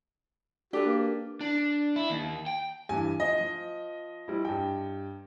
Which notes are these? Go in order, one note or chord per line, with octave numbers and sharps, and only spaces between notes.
D4 F#4 G4 A4 B4
A#3
D4
E4
D#2
G5
G2 E3 G#5
F3 D#5
F3
F3 G3 E4
G2 G5